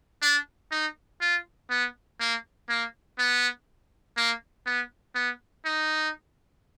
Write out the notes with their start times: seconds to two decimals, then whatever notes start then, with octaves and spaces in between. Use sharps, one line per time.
0.22 D4
0.71 D#4
1.21 F4
1.70 B3
2.20 A#3
2.69 A#3
3.18 B3
4.17 A#3
4.66 B3
5.15 B3
5.65 D#4